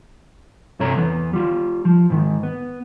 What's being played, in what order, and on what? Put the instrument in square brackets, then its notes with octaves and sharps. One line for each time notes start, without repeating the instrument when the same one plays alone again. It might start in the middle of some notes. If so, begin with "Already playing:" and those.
[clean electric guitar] G2 C3 A4 C#5 A#5
E2 B3
G3 F4
F3
G#2 D#3
B3